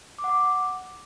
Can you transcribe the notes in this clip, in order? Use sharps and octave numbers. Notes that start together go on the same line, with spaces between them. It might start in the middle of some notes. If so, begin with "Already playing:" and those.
D6
F#5
D6